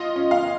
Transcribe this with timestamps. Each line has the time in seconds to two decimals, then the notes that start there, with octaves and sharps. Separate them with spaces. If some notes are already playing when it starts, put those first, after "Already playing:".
Already playing: F4 D#5
0.16 C#4
0.31 F5